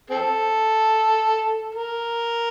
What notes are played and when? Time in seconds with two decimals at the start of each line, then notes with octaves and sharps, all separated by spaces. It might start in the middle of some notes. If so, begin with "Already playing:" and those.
0.10 C4 A4
1.75 A#4